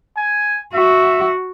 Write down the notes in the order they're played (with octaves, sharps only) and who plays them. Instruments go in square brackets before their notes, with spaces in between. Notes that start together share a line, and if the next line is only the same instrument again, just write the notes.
[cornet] G#5
[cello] F#4 [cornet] E5